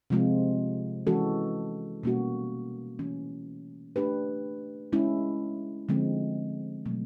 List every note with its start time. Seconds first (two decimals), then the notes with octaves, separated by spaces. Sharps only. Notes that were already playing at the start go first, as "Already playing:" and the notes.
0.10 C3 F3 G#3 C4 F4
1.07 E3 G#3 C#4 F#4 A4
2.03 B2 G3 A#3 C#4 F#4
2.99 E3 A3 C#4
3.96 A3 D4 G4 B4
4.93 G#3 C#4 E4
5.89 D3 F3 G#3 C4
6.86 B2 F#3 A3